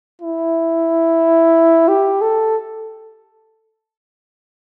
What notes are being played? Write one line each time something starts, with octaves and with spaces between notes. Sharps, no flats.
E4
G4
A4